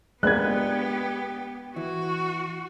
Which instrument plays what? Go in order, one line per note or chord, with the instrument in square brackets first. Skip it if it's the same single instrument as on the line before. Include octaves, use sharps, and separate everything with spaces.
[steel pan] G#3 A#3 B4 [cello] B3 G4 [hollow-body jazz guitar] D4 [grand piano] F#6 G#6
[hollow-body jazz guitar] E3 [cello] F#4